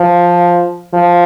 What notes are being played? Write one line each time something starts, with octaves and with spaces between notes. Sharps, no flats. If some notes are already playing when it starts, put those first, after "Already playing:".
Already playing: F3
F3